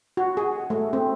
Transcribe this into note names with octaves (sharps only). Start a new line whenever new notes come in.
F#4
G#4
A3
C4